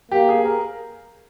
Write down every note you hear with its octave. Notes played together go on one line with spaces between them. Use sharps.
A#3 G4
G#4
A#4